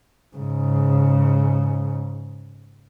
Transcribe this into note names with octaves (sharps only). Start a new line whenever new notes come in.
G#2 C#3